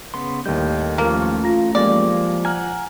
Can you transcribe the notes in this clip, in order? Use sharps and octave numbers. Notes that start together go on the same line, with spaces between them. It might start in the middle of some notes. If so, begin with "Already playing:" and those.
C#3 B3 C6
D#2 A2 G3 A#4 D#5 G6
E3 F3 A3 A#3 C#4
F4 A#5 A#6
F3 G3 G#3 A#3 D5
F#5 G#5 A#5 F6